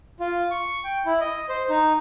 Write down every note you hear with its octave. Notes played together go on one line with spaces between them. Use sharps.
F4
C#6
G5
E4
D#5
C5
D#4